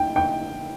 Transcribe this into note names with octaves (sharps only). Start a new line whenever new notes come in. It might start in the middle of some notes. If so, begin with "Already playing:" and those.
Already playing: G5
G5